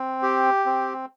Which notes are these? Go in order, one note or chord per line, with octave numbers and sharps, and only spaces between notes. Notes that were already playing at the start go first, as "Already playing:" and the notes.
Already playing: C4
G4
C4